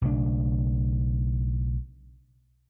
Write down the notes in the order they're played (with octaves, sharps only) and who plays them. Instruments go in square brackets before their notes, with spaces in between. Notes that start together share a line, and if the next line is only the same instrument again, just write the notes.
[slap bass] B1 C#3 A3 D4